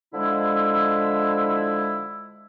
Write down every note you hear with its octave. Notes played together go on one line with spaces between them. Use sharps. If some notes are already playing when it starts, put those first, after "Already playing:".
D3 F3 G#3 E4